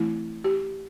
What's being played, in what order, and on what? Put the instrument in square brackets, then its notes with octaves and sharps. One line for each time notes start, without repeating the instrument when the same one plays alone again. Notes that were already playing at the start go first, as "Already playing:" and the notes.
Already playing: [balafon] E3 A3 C4 E4
G4